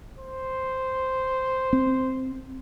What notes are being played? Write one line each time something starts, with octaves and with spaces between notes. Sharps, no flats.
C5
C4